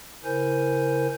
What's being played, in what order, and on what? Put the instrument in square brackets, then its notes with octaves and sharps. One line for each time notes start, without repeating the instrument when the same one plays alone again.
[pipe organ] C#3 E4 A#4 C5 G#5 G6